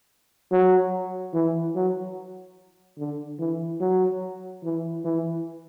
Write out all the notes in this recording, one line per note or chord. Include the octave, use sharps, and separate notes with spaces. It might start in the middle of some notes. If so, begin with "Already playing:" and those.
F#3
E3
F#3
D3
E3
F#3
E3
E3